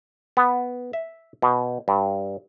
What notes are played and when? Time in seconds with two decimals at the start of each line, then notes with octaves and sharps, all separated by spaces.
0.37 B3
0.93 E5
1.42 B2
1.88 G2